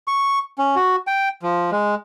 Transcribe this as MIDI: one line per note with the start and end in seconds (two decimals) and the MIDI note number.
0.08 0.39 85
0.58 0.75 61
0.76 0.96 66
1.07 1.29 79
1.43 1.70 53
1.72 1.95 56